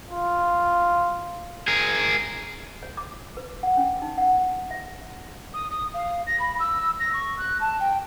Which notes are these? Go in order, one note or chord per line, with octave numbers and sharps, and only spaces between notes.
F4
G#4 A#4
C#5
D6
B4
F#5
C#4
D#4
F#5
E5
D#6
D#6
F5
A#6
B5
E6
A#6
C#6
F#6
A5
G5